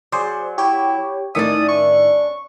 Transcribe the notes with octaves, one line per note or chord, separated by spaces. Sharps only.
F#3 G#4 C5 D5
E4 G4 C#5 G5
A2 D#3 C#4 D4 D5 E5 D#6
C#6